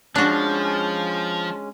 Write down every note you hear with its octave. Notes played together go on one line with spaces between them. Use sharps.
F3 G#3 C#4 D4 F#4